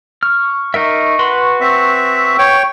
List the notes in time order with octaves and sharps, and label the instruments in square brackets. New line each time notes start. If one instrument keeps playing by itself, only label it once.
[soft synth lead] C#6 [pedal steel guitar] F6
[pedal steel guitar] D#4 A#4 E5
F#4 B4 C6
[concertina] C4 E5 [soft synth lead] C#6
[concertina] C#5 G5